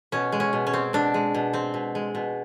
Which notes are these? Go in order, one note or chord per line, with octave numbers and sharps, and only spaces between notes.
B2 C#4
G#3
C#4
B2
C#4
C4
B2 D4
G#3
B2
C4
B2
G#3
B2